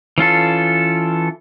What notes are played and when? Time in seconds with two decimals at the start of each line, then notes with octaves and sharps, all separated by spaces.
0.18 E3 C#4 F4 A4